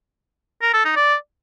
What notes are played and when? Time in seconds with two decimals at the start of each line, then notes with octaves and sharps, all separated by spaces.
0.62 A#4
0.73 A4
0.85 D#4
0.96 D5